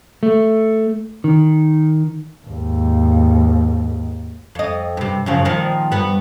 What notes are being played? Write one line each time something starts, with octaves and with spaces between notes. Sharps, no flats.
A3
D#3
D#2 G#2
F2 D#5
G2 C3
F#2 C#3 F3
A#2 D#3 F3
G2 B3